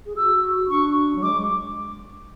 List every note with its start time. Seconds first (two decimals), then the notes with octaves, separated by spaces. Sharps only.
0.06 G#4
0.17 F#4 E6
0.69 D4 C#6
1.15 F#3
1.23 G#3 D6